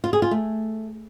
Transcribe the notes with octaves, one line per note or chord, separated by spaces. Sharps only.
F4
G#4
F4
A3